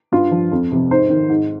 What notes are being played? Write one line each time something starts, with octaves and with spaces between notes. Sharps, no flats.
G2 F4
F3
F2
C3 F3
G#2 C5
D#3
G#2